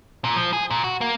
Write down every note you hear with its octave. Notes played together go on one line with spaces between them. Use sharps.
A#2
F3
G#4
A#2
F#4
A#3